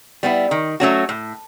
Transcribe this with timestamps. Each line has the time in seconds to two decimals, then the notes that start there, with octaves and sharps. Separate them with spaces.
0.23 G3 B3 E4
0.51 D#3
0.80 F#3 A3 C#4 F#4
1.09 A2